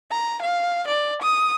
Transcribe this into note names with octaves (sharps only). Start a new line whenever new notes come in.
A#5
F5
D5
D#6